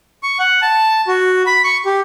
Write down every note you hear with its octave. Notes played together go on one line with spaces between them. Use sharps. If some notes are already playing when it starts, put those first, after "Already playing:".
C#6
F#5
A5
F#4
B5
C#6
G4